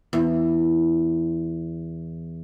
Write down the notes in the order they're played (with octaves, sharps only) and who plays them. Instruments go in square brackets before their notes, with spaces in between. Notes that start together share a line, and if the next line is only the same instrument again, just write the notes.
[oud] E2